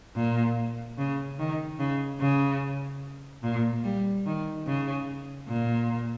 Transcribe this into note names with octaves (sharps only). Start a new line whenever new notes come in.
A#2
C#3
D#3
C#3
C#3
A#2
G3
D#3
C#3
A#2